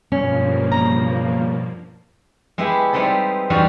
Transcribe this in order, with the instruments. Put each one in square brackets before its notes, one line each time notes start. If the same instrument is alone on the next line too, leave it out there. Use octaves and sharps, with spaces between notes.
[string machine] G2 F3 A#3 [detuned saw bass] B2 [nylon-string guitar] C#4
[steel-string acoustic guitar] C#3 A#5
[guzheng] G#3 B3 E4 G4 G#4
G3 G#3 B3 C4 D#4 A4
E2 G3 D#4 F4 F#4 A#5